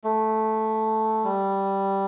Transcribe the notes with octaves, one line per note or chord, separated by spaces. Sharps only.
A3
G3